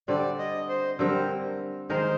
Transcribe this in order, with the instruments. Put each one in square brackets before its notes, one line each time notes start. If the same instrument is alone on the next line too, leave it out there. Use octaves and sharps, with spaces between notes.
[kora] D3 G3 C4 [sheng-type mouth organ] D5
[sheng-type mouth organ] D#5
C5
[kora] D3 G3 C4 [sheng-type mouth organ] A#4
[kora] D#3 G#3 D#4 A#4 [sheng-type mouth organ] C5